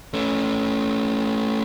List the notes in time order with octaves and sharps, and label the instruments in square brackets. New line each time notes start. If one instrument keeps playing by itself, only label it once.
[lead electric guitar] A3 C#4